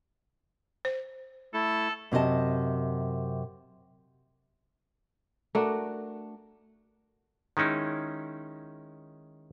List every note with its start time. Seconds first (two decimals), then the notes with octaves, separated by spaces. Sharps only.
0.85 C5
1.54 A3 E4 A4
2.12 F#2 C3 D#4 D#5 A5
5.55 A3 D4 F#4 A#4
7.57 D#3 G#3 C#4 D#4 E4